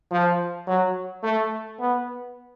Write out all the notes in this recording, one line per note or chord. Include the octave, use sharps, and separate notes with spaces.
F3
F#3
A3
B3